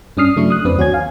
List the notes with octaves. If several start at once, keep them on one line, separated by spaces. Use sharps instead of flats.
G2 C#4 D4 D#6 F6 C7
C#3 F#3 A3 D4 E4 C#6
D#6 F#6
F2 C4 D4 B4 D5 D#6
D#2 F#4 C#5 G#5 G#6
F5 G#5